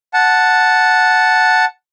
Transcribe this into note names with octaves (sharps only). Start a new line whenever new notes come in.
F#5 A5